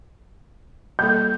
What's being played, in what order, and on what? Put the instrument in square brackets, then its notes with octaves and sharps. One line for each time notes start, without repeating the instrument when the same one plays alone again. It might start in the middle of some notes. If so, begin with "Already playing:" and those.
[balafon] G3 A#3 A4 [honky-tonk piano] G6